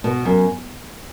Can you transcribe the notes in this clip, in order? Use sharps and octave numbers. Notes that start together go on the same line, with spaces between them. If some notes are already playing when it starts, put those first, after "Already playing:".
B2
F#2